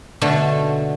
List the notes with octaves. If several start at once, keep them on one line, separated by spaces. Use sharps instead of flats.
B2 D3 A3